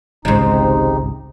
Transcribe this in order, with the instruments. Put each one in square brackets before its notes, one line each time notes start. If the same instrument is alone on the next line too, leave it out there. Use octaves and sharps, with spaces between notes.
[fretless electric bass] G#1 C#2 [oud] G#2 C3 [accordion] D#4